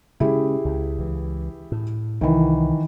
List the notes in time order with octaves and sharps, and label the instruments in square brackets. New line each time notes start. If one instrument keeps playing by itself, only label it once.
[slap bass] C#3 G#3 C#4 [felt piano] E4 G4 G#4
[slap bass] C#2
C#2 E3
A2
[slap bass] C2 [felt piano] D#3 E3